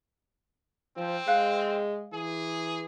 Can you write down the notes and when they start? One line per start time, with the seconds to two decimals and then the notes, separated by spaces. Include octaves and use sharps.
0.97 F3 C4
1.28 G#3 F5 F#6
2.13 E3 G#4